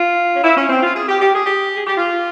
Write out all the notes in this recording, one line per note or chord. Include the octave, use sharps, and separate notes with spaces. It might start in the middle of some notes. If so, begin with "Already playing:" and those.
Already playing: F4
C#4
E4
C#4
C4
F4
G#4
G4
G4
G#4
G4
G#4
G4
F4